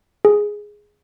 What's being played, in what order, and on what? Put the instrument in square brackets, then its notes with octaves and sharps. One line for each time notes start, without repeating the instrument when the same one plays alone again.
[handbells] G#4